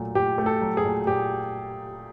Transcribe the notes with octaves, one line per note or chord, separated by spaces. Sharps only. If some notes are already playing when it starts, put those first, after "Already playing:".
Already playing: A#2 F#3 A3
A#2 G4
A3
A4
F#3
G#4
A#2
A#2 G4